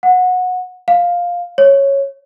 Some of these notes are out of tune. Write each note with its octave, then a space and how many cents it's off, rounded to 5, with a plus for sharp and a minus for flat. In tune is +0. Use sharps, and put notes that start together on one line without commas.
F#5 -20
F5 +10
C#5 -5